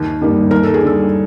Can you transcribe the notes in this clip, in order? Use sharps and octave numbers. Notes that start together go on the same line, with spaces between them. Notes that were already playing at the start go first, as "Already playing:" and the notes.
Already playing: D#2
D#3 G3 A#3
D#2 A#4
A4
G#4
D3 G3 A4